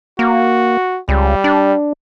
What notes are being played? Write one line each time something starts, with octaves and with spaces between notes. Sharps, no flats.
A#3 F#4
C#2 G3
D4